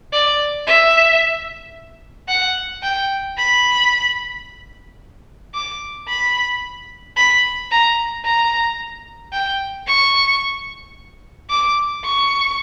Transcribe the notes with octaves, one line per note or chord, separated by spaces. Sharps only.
D5
E5
F#5
G5
B5
D6
B5
B5
A#5
A#5
G5
C#6
D6
C#6